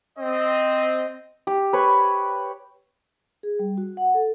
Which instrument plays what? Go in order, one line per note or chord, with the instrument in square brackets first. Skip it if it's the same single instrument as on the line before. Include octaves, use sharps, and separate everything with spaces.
[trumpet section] C4 D#5
[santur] G4
B4 C#5
[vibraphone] G#4
G3
F#4
F#5
A4